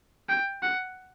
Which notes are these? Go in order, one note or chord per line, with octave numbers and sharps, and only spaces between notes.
G5
F#5